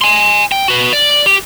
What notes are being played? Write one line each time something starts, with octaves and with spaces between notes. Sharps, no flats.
G#5 C6
G5
F#4 B4
D5
G4